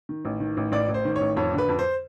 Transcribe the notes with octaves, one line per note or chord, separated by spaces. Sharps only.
D#3
A1
D#3
A1
A1 D5
A1
C5
D#3
C#5
A1
F2 C#5
D3
B4
F2
C5